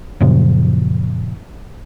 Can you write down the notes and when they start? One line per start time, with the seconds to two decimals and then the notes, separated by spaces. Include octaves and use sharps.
0.20 F#2 A#2 C#3 F3